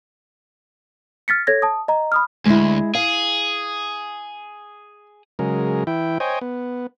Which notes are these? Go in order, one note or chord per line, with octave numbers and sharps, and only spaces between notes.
F6 A6 B6 C#7
A4 C#5 G#6 A#6
A5 D#6
D#5 A#5
B5 D#6 F6
D2 G#3 E4
G#4 F5
C#3 F#3 G#3 A#4
E3 E4 G5
C5 C#5 D#5 G5 G#5
B3